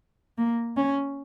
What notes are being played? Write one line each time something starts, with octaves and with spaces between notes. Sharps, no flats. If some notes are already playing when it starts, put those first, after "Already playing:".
A#3
C#4